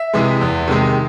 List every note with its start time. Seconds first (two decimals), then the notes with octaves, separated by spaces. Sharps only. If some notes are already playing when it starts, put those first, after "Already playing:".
Already playing: E5
0.13 C3 E3 G#3
0.41 E2
0.68 C3 D#3 G#3